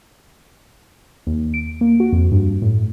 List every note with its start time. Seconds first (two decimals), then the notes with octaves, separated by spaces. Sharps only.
1.27 D#2
1.54 D7
1.81 A#3
2.00 F#4
2.12 F2
2.32 G2
2.62 A2